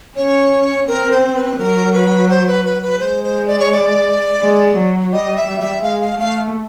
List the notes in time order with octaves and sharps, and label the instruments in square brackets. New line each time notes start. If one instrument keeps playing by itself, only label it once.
[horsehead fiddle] C#4 [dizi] C#5
[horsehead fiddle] C4 [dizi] A#4
[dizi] C5
B4
[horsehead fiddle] F#3 [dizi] A#4
[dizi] B4
C5
B4
B4
B4
[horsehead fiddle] G#3 [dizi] C5
[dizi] C5
D5
C#5
D5
[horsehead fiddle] G#3
F#3
[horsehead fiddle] G3 [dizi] D#5
[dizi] E5
[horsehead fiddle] G3
[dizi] E5
[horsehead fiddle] G#3 [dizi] F5
[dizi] F5
[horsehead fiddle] A3 [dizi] F5